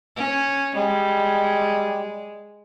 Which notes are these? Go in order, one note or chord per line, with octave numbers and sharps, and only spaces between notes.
C#4
G3 G#3